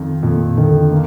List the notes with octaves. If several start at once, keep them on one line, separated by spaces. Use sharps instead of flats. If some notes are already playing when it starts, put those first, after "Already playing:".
Already playing: F2 D#3
F2 A#2
D3 D#3
A#3